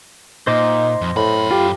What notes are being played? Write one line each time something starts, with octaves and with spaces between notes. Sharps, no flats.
A#2 D#4 C5 D#5 D6
F2
F#2 A2 B5
F4 G4